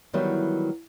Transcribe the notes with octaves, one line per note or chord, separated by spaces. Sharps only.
D#3 E3 F#3 G3 B3 E4